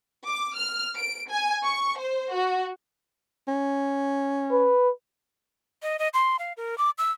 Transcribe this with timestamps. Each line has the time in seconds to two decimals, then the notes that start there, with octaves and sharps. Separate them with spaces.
0.28 D6
0.56 F6
0.98 D7
1.30 G#5
1.64 C#6
1.98 C5
2.34 F#4
3.48 C#4
4.51 B4
5.83 D#5
5.99 D#5
6.14 C6
6.39 F5
6.57 A#4
6.78 D6
6.98 E6